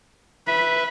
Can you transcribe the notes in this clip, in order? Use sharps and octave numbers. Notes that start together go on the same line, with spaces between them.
B4 E5 B5